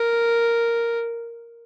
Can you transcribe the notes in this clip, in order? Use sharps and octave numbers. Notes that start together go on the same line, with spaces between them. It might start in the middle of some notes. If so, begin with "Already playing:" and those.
Already playing: A#4